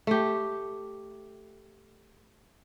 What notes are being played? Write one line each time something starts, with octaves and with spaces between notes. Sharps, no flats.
A3 G4